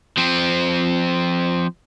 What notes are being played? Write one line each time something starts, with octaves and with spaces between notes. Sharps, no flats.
F3 C4